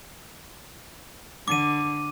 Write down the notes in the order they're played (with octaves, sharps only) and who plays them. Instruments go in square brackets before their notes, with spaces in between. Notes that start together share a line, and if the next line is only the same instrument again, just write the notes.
[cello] D3 [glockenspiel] D6 D#7